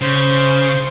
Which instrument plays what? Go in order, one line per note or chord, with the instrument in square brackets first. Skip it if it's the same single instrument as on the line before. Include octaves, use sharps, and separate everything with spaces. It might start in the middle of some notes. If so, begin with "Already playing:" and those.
[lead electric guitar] C#3 [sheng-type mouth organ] C5